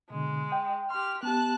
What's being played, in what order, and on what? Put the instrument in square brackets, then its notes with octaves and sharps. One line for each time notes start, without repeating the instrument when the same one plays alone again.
[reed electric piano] B2 D3 [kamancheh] G#3
[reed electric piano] G5
[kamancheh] G4 F6 [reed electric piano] C6
[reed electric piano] B3 G4 [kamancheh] A5 F#6